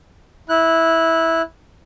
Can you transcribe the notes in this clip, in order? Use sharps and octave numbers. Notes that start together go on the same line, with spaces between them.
E4 F#6